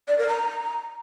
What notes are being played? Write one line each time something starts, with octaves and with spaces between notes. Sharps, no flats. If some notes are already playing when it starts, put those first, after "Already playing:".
D5
A#4
A#5